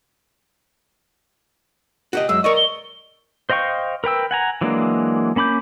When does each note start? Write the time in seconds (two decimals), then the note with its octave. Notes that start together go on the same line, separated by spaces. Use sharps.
2.13 F#4 G4 D#5
2.29 F#2 G#3 E6
2.44 A#4 D5 D#5 C#6
2.57 G7
3.50 C5 D#5 F5 G5 C#6
4.04 A#4 B4 G5 E6
4.31 F#5 G#5 A#5
4.61 E3 F#3 G#3 A#3 D4
5.36 A#3 C#4 B5 D6 G6